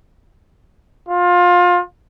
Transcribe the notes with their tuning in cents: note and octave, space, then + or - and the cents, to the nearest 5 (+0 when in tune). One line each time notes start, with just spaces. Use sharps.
F4 +25